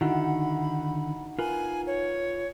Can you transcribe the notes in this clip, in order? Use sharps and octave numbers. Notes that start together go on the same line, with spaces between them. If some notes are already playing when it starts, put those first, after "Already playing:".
D3 D#3 D#4 E4 F#4 F#5 B5
F4 A#4 B4 G#5
C#5